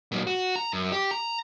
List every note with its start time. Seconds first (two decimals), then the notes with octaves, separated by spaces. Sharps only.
0.12 A#2 F#3
0.27 F#4
0.56 A#5
0.73 F#2
0.92 G4
1.11 A#5